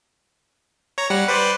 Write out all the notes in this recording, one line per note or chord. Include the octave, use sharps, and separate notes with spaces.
C#5 A#5
G3 F#5
B4 C5 D5